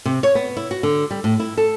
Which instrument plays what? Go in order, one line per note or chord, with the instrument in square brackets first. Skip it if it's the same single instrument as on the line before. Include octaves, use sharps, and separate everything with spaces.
[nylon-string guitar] C3
C#5
B3
E4
F#4
D3
G3
A2
E4
A4